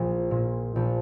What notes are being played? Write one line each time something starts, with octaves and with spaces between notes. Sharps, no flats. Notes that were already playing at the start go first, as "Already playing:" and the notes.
Already playing: A#1
A#2
A#1